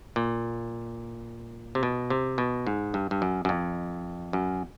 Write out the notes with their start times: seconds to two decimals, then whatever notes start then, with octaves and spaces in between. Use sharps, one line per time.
0.16 A#2
1.75 C3
1.83 B2
2.10 C3
2.38 B2
2.67 G#2
2.94 G2
3.11 G2
3.22 F#2
3.45 F#2
3.49 F2
4.33 F#2